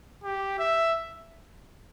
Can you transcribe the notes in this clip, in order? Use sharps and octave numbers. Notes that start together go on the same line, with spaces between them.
G4
E5